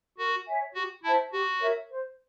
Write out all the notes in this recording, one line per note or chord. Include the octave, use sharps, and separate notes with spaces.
F#4 A#4
C#5 E5 G#5
F#4 G4
E4 C5 E5 A5
F#4 G4
A#4 C#5 E5
C5